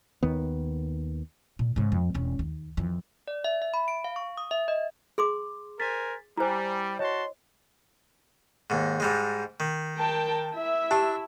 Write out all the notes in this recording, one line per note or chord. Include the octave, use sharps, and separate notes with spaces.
D#2 D#3 B3
A#2
G#2 C#3
F2
E1 C#4
D#2
F2 E3
D5
E5
E5
B5
D7
F5
C#6
D#6
E5
D#5
G#4 C6 D6
A#4 C5 G#5 A6 B6
G3 E4 C5 G#5 A#5
F#4 C#5 D#5 A5 C6
D#2 G#2
G#2 G3 G#3
D#3
A#4 G5 A5
E4 E5
D4 G4 G#5 A5